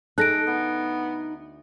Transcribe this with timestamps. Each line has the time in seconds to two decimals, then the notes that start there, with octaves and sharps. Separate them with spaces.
0.18 D#4 G#4 A4 F#6 A#6 D7
0.47 D2 B3